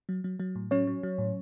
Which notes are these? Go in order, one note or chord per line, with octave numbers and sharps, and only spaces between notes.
F#3
F#3
F#3
A2
F#3 C#4 C#5
F#3
F#3
A2